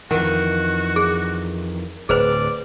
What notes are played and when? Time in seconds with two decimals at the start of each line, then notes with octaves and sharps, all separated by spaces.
0.11 F2 D#3 E3 F#4 F#5
0.96 G#4
2.09 D1 G#4 B4 C5 D5